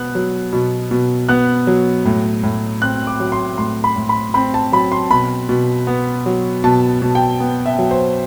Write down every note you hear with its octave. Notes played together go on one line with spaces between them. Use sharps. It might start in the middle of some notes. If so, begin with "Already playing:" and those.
Already playing: B2 B3 F#6
F#3
B2
B2
B3 F#6
F#3
A2
A2
C4 F#6
D6
F#3
C6
A2 C6
B5
A2
B5
C4 B5
A5
F#3 B5
C6
B2 B5
B2
B3
F#3
B2 A5
B2
G5
B3
E5
F#3
C5